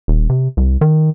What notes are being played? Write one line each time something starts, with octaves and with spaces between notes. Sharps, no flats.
D#1
C3
C2
D#3